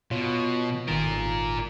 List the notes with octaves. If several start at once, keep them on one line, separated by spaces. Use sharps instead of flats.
B2 F4 C#5
G#1 D#3 F4 A#4